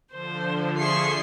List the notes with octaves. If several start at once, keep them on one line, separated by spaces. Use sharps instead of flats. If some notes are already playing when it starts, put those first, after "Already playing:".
D3 F3 C5
G#4 E5 C6 C#6 C7